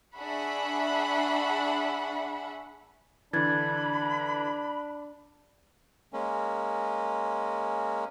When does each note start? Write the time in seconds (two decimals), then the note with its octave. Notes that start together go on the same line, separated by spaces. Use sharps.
0.16 D4 G#4 E5 F#5 B5 C#6
3.33 D3 E3 D4 B5 F#6 G#6 A6
6.13 G#3 A#3 C#4